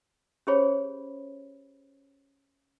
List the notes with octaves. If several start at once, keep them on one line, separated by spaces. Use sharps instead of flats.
C#4 G4 G#4 C5 C#5 B5